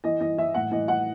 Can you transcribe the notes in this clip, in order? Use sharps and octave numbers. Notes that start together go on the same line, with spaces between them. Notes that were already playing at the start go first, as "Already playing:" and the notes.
E3 D#5
E3 D#5
E3 E5
A2 F#5
E3 D#5
E3 F#5